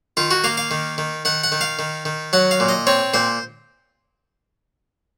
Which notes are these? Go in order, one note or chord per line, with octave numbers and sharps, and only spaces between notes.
D#3 F4
F#4
A#3 F5
F5
D#3
D#3
D#3 F#5
F#5
D#3
F5
D#3
D#3
F#3 F#5
F5
A#2
D#5
C4 C#5
A#2 C5